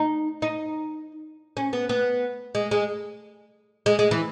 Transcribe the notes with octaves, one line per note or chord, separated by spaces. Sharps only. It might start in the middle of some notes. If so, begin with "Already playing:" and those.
Already playing: D#4
D#4
C#4
B3
B3
G#3
G#3
G#3
G#3
E3